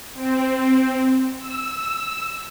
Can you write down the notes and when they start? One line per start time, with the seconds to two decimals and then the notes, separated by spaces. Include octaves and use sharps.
0.14 C4
1.38 E6